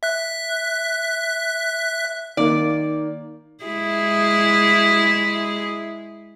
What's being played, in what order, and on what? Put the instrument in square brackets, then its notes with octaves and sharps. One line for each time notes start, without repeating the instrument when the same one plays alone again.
[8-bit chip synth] E5 F#6
[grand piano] D#3 A#3 [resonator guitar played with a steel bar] D5
[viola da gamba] G#3 E4 G#4